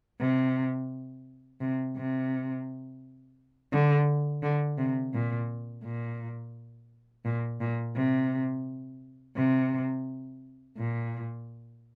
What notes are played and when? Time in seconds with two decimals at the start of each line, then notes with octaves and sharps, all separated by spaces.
0.20 C3
1.61 C3
1.96 C3
3.73 D3
4.43 D3
4.78 C3
5.14 A#2
5.84 A#2
7.25 A#2
7.61 A#2
7.96 C3
9.37 C3
10.77 A#2